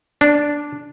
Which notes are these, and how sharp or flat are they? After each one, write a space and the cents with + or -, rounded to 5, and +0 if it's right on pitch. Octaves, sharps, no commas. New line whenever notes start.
D4 -5